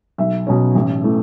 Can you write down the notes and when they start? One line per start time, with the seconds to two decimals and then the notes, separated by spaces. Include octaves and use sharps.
0.18 B1 E5
0.47 B2 F#3 C#4
0.75 A1
1.04 E3 A3